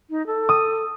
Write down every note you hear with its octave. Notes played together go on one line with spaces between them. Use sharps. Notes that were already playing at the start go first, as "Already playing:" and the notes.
D#4
A4
D#6